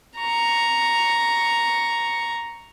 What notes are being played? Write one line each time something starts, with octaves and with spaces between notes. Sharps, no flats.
A#5 C#6